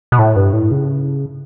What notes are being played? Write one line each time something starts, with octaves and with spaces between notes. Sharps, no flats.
B2
A2
G2
A2
C#3